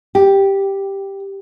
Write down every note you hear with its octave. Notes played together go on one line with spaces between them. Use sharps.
G4